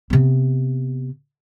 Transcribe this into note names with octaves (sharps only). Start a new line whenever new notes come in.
C3 B3